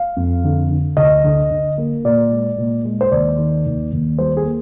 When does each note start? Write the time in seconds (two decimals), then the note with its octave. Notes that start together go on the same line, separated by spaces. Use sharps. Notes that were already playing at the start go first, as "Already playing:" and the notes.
Already playing: F5
0.16 F2
0.44 D3
0.70 D3
0.97 D2 D#5
1.24 D3
1.51 D3
1.78 A#3
2.04 A#2 D5
2.31 G#3
2.58 A#2
2.85 G#3
3.01 C5
3.12 D#2 D5
3.38 D#3
3.66 D#2
3.92 D#2
4.18 G3 C5
4.37 G#4
4.46 A#3